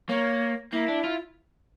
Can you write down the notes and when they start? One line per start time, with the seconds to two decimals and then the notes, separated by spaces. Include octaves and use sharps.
0.09 A#3 C#5
0.72 A#3 E4
0.88 D4
1.04 F4